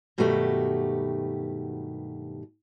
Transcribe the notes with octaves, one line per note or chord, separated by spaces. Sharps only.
G2 B2 D#3 F#3 A3 G4